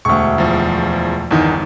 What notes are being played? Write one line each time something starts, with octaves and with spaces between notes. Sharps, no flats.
E1 D2 C#6
E2 F3
G1 E2 D#3